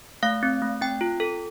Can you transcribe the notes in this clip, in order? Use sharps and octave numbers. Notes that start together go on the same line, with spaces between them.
A3 F5
C4
A3
C4 G5
F4
A4